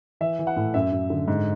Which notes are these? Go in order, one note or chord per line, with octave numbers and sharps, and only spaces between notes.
E3 E5
E3
F#5
A2
F#2 E5
F#2
D3
G#2